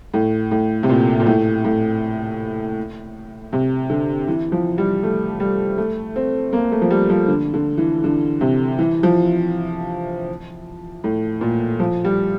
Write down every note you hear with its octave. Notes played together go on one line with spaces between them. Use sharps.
A2
A2
C3
A#2
A#2
A2
A2
C3
D3
E3
F3
G3
A3
G3
A3
C4
A#3
A3
F3
G3
F3
D3
D3
E3
D3
C3
E3
F3
A2
A#2
F3
G3